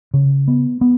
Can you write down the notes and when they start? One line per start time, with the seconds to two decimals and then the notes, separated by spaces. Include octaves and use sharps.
0.14 C#3
0.48 B3
0.81 B3